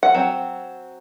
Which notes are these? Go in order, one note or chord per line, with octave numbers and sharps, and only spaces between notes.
F#5
F#3 C4